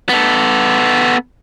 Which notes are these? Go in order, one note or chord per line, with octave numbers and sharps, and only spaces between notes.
B3 A4